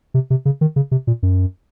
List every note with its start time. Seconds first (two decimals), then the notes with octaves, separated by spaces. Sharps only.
0.14 C3
0.30 C3
0.45 C#3
0.61 D#3
0.76 C#3
0.91 C3
1.07 A#2
1.23 F#2